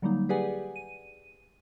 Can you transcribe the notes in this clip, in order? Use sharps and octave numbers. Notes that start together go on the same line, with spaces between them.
D3 F#3 G3 A#3 D#4
G4 G#4 B4 D5 F#5 G#5
D#7